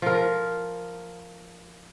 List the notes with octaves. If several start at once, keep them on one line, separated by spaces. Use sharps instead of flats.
F3 A#4